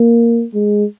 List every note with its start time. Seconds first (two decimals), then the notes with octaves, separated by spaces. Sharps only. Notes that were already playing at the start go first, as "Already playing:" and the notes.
Already playing: A#3
0.54 G#3